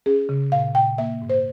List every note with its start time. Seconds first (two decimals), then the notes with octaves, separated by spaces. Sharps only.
0.06 C#4 G#4
0.29 C#3
0.52 A#2 F5
0.75 A#2 G5
0.98 A#3 E5
1.22 G#2
1.30 C5